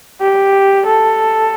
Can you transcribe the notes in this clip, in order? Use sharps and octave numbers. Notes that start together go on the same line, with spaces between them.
G4
A4